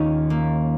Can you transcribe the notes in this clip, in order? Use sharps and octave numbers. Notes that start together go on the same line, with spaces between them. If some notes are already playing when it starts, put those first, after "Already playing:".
Already playing: D#2 D#3 C#4 F4
A#3